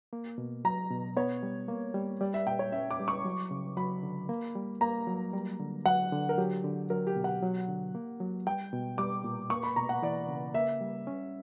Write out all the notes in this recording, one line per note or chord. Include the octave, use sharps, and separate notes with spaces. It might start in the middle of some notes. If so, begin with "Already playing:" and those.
A#3
B2
F#3 A#5
B2
B3 C#5
G3
A#3
G3
G3 D5
E5
A#2 G5
C#5
C#4 E5
D6
G3
C#6
F#3
C#3
F#3 B5
D3
A#3
G3
A#3 A#5
F#3
G3
D3
F#3 F#5
D3
A#4
F#3 G4
D3
F#3 A#4
G4
B2
F#5
F#3
D3
A#3
F#3
G3 G5
B2
G3 D6
A#2
A#3 C#6
B5
B2 A#5
F#5
E3 D5
C#3
A#3 E5
G3
C#4